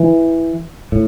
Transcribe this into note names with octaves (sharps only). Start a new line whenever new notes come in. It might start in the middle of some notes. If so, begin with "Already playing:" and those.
Already playing: E3
A2